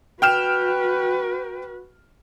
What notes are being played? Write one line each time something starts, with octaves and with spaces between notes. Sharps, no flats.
F#4 B4 G5 F6 E7